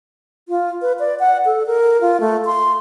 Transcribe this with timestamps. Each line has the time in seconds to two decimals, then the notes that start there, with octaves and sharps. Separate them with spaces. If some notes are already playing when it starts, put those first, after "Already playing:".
0.49 F4
0.82 B4
0.99 D5
1.20 F#5
1.45 A4
1.67 A#4
2.01 F4
2.20 A3
2.45 C6